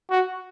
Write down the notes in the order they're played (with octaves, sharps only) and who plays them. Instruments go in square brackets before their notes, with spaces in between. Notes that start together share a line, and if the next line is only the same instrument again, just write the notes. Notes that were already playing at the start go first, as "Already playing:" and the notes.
[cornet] F#4